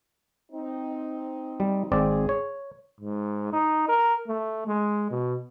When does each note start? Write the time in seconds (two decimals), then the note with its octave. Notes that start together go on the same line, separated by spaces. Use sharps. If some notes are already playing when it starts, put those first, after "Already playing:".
0.52 C4 D#4
1.60 G3
1.92 G#1 C4 G#4 D5
2.29 C#5
3.00 G#2
3.53 D#4
3.89 A#4
4.27 A3
4.67 G#3
5.10 B2